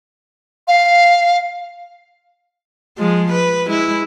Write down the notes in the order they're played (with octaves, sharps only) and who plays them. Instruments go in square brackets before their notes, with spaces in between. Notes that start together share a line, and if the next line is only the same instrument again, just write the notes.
[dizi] F5
[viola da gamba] F3 G#3
B4
G#3 E4